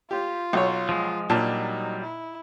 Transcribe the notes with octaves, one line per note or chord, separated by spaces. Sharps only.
F4 G4
B1 C#5
F3 G#3
A#2 F#3 G3 D4 D#4 A5
E4